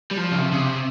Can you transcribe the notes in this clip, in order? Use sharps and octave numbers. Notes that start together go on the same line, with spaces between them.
G3
F3
C#3
C3
C#3
C3